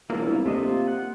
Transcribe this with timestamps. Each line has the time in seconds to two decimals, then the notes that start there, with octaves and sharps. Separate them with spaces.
0.10 E1 A#3 E4 F4
0.26 C2
0.46 C3 A3 D4 D#5
0.63 F4
0.88 F#5